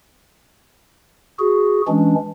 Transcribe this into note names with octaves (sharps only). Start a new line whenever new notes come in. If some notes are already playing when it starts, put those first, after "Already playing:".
F#4 G#4
E3 G#3 C#4 D4